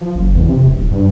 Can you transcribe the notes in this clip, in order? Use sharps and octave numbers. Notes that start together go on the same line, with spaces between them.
F3
F#1
E2
C3
E1
D1
G2